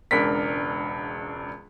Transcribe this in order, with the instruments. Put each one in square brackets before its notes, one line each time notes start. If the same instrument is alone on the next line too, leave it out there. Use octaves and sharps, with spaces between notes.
[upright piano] E1 C#2 D4 A#4 B6